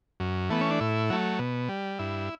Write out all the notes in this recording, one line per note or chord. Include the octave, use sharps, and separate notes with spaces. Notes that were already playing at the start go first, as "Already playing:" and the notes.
F#2
E3 A3 B3
C#4
D4
A2 E4
F#3 A3
B2
G3
G2 E4